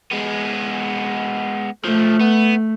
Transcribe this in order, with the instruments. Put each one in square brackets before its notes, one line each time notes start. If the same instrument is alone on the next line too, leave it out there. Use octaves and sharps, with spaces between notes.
[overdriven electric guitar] G#3 B3
[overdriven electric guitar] B1 F3 [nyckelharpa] A3
[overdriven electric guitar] B3